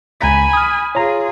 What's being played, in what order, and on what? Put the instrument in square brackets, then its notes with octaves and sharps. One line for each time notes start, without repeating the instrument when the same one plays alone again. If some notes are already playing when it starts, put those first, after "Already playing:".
[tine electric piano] C#2 A#5 B6 [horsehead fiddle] G#5 B5
[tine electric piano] D#6 F6
[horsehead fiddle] F4 G#4 [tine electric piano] C#5 A#5